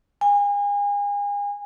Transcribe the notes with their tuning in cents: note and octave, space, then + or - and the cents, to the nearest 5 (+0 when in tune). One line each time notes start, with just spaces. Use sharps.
G#5 -35